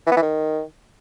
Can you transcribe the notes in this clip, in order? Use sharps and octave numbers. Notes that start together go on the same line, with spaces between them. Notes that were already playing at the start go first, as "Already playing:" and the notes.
E3
B3
E3
D#3